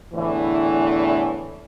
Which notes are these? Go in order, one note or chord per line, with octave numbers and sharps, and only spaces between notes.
E2 A2 D3 E3